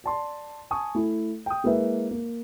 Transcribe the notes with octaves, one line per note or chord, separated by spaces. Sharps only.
D5 A5 C6
G#5 A5 C#6 D#6
A3 E4
G5 D#6
G#3 A#3 E4 B4 E5
A#3